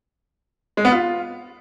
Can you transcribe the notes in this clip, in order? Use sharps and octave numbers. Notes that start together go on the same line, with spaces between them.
G#3
B3
F4